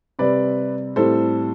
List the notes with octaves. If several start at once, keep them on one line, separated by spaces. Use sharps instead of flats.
C3 G3 C4 B4 D5
A2 G3 C4 A4 C5